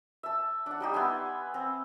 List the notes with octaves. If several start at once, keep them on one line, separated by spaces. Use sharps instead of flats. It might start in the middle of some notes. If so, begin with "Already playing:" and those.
E5 A5
D4 F#5
G3 D#4 G4
B3 E5 G#5 C6
C4